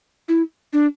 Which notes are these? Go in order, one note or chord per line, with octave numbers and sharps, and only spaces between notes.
E4
D4